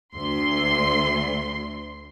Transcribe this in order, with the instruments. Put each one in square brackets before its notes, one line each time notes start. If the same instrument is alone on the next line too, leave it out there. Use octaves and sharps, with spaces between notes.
[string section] D2 C6